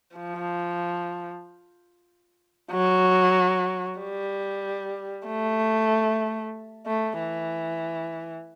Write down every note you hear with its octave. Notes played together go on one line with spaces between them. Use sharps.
F3
F#3
G3
A3
A3
E3